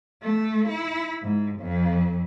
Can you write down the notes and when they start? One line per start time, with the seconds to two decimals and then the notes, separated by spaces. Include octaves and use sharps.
0.23 A3
0.68 E4
1.22 G#2
1.59 F2